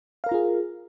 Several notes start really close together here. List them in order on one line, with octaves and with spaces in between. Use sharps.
F5 A#4 A#5 F4 G#4